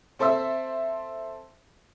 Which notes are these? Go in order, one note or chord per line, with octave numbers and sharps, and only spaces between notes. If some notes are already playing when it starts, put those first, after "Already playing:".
C4 A4 C5 E5 E6